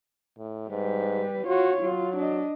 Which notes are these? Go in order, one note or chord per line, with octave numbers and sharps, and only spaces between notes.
A2
G#2 G3 B4
F4 F#4 C#5
F#3 F4
D4 D#5